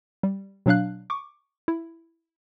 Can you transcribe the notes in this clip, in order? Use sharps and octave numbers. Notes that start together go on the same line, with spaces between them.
G3
B2 F#3 D4 F5 F#6
C#6 D6
E4